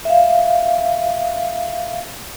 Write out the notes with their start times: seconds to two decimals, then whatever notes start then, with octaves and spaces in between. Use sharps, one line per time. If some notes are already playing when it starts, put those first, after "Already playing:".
0.05 E5 F5